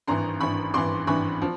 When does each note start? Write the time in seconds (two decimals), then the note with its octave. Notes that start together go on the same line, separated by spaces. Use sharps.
0.07 G#1 G2 E3 A#5 C6
0.41 G#1 G2 E3 B5 C#6
0.74 G#1 G2 E3 C6 D6
1.07 G#1 G2 E3 B5 C#6
1.42 F3